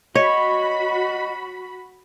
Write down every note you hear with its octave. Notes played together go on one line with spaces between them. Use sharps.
F#4 C#5 D#5 B5